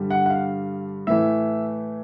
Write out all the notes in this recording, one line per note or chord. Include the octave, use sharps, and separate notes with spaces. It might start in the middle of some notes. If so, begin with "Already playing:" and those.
Already playing: G2 D3 G3
F#5
F#5
F5
A2 E3 A3 E5